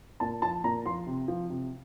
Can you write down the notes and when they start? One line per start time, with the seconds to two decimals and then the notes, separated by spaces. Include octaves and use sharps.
0.20 A#2 A5
0.42 F3 A5
0.64 A#2 A#5
0.86 F3 C6
1.07 C3
1.28 F3
1.50 C3